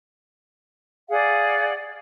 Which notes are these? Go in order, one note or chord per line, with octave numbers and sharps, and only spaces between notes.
G#4 D5 F5 F#5